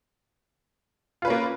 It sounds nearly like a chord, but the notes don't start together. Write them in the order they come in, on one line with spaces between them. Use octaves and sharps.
F4 B4 C#4 A#3